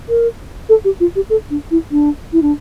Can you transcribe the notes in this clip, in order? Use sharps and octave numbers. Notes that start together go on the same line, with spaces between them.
A#4
A4
G4
F4
G4
A4
D4
E4
D4
E4
D4